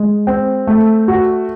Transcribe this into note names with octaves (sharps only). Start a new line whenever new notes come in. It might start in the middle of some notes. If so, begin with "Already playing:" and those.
Already playing: G#3
C4
A3
F#4